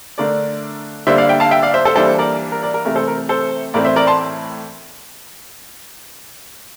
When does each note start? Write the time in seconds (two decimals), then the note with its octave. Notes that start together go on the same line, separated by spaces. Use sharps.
0.18 D3 A3 D4 A#4 D5
1.07 D3 G3 A#3 D4 C5 E5
1.18 D5 F5
1.29 E5 G5
1.40 F5 A5
1.51 E5 G5
1.62 D5 F5
1.74 C5 E5
1.85 A4 C5
1.96 E3 G3 A#3 D4 A4 C5
2.19 A#4 D5
2.52 A#4
2.63 A#4 D5
2.74 A#4
2.85 C3 E3 A3 A#4
2.96 A4 C5
3.08 A#4
3.29 A4 C5
3.74 A2 E3 A3 C4 A#4 D5
3.85 C5 E5
3.96 A#4 D5
4.07 A5 C6